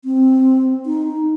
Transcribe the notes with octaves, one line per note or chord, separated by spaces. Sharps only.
C4
D#4